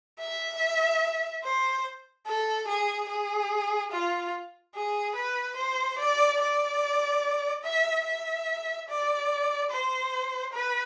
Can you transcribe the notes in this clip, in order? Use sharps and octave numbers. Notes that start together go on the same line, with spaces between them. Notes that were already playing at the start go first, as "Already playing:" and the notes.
E5
C5
A4
G#4
G#4
F4
G#4
B4
C5
D5
D5
E5
E5
D5
C5
B4